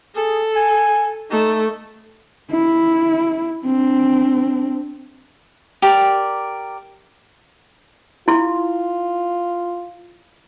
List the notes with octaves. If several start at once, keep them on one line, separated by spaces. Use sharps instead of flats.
G#4 A4
G#5
A3 D#4
E4
C4 D4
G4 A#4 D5
E4 F4 C6